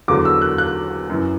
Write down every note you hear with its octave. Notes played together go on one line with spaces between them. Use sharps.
E2 D3 F#3 D6
E6
F#6
F#6
F#2 E3